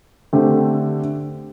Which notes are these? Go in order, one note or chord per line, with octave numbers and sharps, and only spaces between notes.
D3 A3 C4 G4